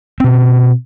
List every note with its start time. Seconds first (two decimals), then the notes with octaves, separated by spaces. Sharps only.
0.20 B2 C4